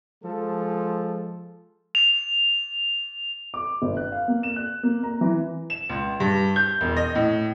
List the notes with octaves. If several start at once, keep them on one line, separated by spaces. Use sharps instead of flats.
F3 G#3 A4
F7
D6
G1
F#6
F5
A#3
E7
F#6
A#3
A#5
E3
E7
C#2
G2
G6
E1
D#5
A2